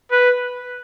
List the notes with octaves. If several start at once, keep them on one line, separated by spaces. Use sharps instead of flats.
B4